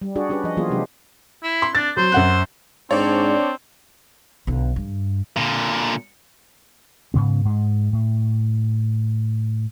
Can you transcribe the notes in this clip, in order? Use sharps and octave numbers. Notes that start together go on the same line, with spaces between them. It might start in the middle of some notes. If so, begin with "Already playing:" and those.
G3
D4 F#4 G#4 D5
C#4 D4 G4 G#4 B4
F3 D#5
E3 F#3 A#3 B3 F4 G#4
C3 F#3 G#3 D4 G4
E4
C6
D4 A6
F#3 C5
F#2 F#5 F#6
G#2 C4 D4 C#5 D5
B1 D3
G2
A#2 D3
G#2 C#3 B3
G#2 G#3
A2